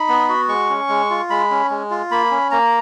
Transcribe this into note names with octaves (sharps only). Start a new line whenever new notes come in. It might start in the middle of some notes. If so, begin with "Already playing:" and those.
Already playing: D#4 B5
B3
F#4
G#3 C#6
C#4
G#3
F4
G#3 B5
C#4
G#3
F4
A#3 B5
C#4
A#3 A#5